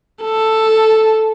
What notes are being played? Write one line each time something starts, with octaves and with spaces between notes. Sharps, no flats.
A4